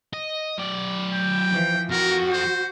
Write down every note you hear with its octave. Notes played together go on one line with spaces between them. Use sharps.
D#5
F#3 D5
G5
E3 F3
F2 F3 F#4 A#4
C5